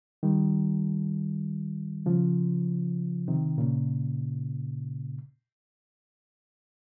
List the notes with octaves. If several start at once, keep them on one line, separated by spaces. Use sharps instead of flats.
D#3 G3
C#3 F3
C3 D#3
A#2 C#3